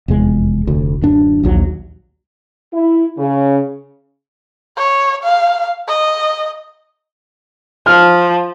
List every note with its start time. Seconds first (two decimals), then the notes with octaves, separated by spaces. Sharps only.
0.08 F1 E2 G#3
0.67 F1 D2
1.02 D1 F#2 D4
1.43 A#1 D#2 F#3
2.73 E4
3.18 C#3
4.77 C#5
5.24 F5
5.88 D#5
7.86 F3 F6